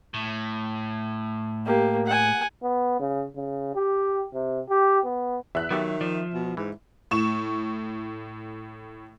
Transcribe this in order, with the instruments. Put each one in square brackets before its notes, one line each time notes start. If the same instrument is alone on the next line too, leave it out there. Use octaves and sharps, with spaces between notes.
[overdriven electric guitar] A2
[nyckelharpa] A#3 G4
F#5 G#5
[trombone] B3
C#3
C#3
G4
C3
G4
B3
[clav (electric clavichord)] E2 [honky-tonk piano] E5 F#6
[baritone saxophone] D#3 [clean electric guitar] F#3 [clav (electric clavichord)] B3 G4 A4
[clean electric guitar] F3 [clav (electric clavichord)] D5
[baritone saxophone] B2
[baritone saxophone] G#2 [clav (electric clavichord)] E3
[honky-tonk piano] A2 C#6 E7